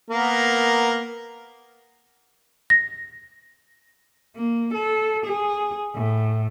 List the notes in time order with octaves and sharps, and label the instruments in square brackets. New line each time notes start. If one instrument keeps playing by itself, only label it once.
[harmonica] A#3 B3 A#4
[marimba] A#6
[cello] A#3
A4
G#4
A2